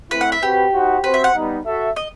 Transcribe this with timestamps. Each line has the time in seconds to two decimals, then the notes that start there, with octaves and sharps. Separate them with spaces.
0.11 A3 C4 E4 B4
0.21 F#5
0.32 E5
0.41 C4 F#4 G4 B4
0.73 D#4 F#4 C5 F#5
1.04 C4 F#4 B4 C5
1.14 E5
1.24 F#5
1.34 G3 B3 D#4
1.65 F#4 A4 E5
1.96 D#5